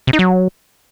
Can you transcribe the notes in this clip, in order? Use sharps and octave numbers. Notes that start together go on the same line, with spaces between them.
C3
D#4
F#3